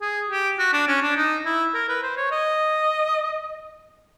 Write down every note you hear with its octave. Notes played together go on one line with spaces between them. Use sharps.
G#4
G4
F#4
D4
C#4
D4
D#4
E4
A#4
B4
C5
C#5
D#5